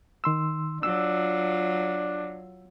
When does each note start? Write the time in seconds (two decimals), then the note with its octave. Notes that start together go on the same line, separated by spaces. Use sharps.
0.24 D#3 C6 E6
0.83 F#3 D4 F4 E6